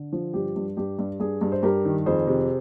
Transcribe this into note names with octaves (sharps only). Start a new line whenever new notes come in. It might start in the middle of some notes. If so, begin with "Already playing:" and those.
Already playing: D3
F3
G2 G4
G2
G2 G4
G2
G2 G#4
G2
C5
G2 G4 A#4
D#3
F2 G#4 C5
C3